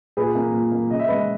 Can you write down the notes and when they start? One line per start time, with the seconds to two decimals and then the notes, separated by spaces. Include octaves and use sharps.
0.17 A#2 G#4 B4
0.35 A#3
0.53 A#2
0.72 A#3
0.90 C#3 D#5
0.99 E5
1.08 G#3 B3 B4 D#5